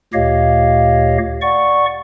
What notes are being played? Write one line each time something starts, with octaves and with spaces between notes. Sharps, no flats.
D2 A#2 G4 C#5 D#5 F5
D5 F#5 C#6